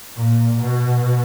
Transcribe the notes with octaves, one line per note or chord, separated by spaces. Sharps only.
A#2
B2